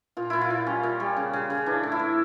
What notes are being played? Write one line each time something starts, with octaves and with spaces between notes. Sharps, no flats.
A#2 F4
A#2 E4
F4
A#2
G3 C#4
A#2
G3
C#3
C#3
C#3
E3 D4
A2
E4
A2